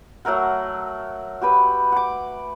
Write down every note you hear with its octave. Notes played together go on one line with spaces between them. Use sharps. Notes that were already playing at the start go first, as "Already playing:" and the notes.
F#3 A3 A#4 F#5
F#4 G4 B4 B5
F#5 D6